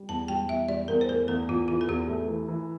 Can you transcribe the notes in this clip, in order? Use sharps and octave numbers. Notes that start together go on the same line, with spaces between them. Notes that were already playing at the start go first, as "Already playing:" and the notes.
Already playing: G3
E2 A5
G3 G5
E2 E5
G3 D5
E2 A#4
C5
A3 A#4
E2 A4
E2 F4
E3 F4
A4
E2 G4
A3
E3
E3